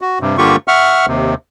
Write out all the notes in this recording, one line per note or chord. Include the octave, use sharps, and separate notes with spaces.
F#4
G2 C3
G2 D3 A#3 F4 G4 C#6
E5 F#5 C#6 F6
D#2 C3